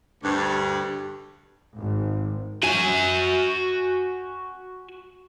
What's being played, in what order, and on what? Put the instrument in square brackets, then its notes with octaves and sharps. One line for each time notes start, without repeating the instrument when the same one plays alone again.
[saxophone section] D2 G2
[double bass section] G#1
[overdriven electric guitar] F#4 G#5